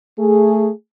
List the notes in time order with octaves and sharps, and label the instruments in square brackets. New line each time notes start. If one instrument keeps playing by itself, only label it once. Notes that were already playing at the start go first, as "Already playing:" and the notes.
[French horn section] A3 G#4